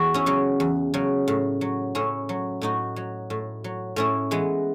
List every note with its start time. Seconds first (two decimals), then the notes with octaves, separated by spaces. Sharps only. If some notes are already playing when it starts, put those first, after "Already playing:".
Already playing: E2 F#4
0.14 C#4 E4
0.26 C#3 F#3
0.60 E2
0.94 C#3 F#3
1.28 A2
1.61 F#3
1.95 A2 C#4 E4
2.29 F#3
2.62 A2 D#4 F#4
2.96 F#3
3.30 A2
3.64 F#3
3.96 A2 C#4 E4
4.31 E3 G#3 B3